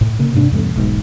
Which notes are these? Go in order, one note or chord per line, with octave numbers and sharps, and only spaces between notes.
A2
C#3 A#3
G#2 C3 C#4 D4
E2 G2 B2 A3
E1 B1 G#2 B2